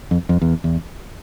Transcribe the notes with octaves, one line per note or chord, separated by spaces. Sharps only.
F2
F2
E2
E2